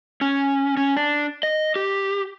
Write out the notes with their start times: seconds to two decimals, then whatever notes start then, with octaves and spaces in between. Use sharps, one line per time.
0.21 C#4
0.77 C#4
0.97 D4
1.43 D#5
1.76 G4